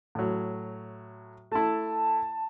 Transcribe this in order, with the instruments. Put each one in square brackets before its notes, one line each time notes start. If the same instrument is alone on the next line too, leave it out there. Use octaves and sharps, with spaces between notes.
[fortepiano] A2 F#3
[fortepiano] A3 E4 [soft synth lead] A5